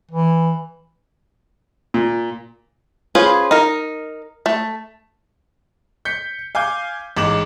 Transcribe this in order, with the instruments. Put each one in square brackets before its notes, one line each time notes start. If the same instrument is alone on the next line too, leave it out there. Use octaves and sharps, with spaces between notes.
[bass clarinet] E3
[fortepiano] A#2
[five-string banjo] C#4 F4 G#4 B4 C5
D#4 A#4
A3
[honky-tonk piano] G6 B6 C#7
F5 G#5 D6 G6
A1 G#2 D6 E7 F#7